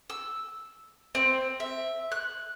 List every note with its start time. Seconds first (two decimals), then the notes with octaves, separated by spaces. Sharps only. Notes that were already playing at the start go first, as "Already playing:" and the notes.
0.10 E6
1.15 C4
1.60 E5
2.12 F#6